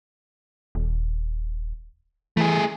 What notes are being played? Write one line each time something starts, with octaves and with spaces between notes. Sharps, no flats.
D#1
E3 A3 G#4